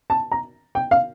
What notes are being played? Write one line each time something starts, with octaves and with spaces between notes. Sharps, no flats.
A5
A#5
G5
F5